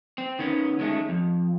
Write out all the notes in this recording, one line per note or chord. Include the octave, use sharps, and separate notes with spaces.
C4
D#3 B3 C#4
D#3 G#3 A3 C#4
F2